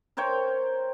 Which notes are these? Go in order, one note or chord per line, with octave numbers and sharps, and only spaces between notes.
A#4 C5 C#5 G5